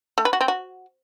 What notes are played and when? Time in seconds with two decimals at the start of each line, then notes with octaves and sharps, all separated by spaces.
0.18 A3
0.25 B4
0.33 F#4
0.41 C4
0.48 F#4